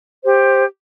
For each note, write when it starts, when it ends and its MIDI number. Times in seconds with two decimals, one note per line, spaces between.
0.23 0.63 67
0.23 0.63 72